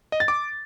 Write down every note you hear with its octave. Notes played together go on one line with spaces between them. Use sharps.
D#5
A6
D6